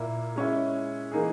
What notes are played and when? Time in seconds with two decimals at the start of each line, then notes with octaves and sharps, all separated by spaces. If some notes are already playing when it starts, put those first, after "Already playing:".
Already playing: A#2 A#3 E4
0.36 G#3 C#4 E4
1.12 E3 A#3 D#4 G#4